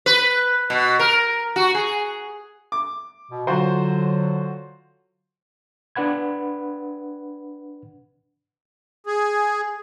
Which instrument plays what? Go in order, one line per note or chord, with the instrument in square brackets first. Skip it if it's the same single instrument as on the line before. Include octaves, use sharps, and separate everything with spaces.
[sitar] B4
B2
A#4
F#4
G#4
[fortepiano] D6
[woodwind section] B2
[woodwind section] D3 F#3 [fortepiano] F4 F#4 C5
[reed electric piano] D4 B4 F#5 B5 G#6
[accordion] G#4